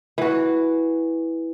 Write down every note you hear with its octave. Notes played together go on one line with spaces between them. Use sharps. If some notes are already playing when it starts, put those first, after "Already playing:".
E3 F#4